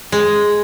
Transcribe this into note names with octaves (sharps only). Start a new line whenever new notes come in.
G#3